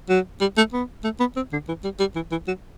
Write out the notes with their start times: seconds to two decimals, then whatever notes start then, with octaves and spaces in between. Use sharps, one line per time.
0.09 F#3
0.41 G3
0.57 A3
0.73 B3
1.04 A3
1.20 B3
1.36 C4
1.52 D3
1.68 E3
1.84 G3
2.00 G3
2.15 E3
2.31 E3
2.48 F#3